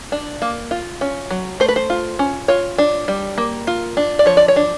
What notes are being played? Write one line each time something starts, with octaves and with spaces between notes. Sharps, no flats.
D4
A#3
F4
C#4
F#3
A3 C5
B4
C5
F4
C#4
F4 C#5
D4
G3
A#3
F4
D4
D5
F3 C#5
D5
C#5
D4